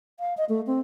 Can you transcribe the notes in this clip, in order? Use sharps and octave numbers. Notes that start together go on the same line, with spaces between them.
F5
D#5
A3
C4